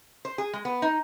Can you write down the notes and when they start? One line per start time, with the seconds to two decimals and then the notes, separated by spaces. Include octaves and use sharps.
0.25 C5
0.38 G#4
0.53 G#3
0.65 B3
0.82 D#4